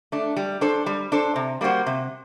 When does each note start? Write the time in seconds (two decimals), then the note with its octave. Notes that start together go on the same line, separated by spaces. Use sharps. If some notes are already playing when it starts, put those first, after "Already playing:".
0.12 A3 D4
0.37 G3
0.61 D4 A4 C5
0.86 G3
1.12 D4 A4 C5
1.36 C3
1.61 G3 A#3 F#4 C5
1.87 C3